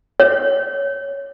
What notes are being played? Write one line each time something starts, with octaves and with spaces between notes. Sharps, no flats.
C#5